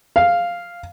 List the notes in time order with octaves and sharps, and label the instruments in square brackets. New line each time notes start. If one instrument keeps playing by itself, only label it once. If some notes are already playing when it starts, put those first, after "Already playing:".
[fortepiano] F5